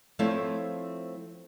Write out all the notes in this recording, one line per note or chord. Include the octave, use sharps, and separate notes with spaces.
F3 A3 C4 E4 F4 C#5